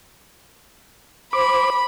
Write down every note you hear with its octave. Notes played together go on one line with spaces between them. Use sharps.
C5 B5 D6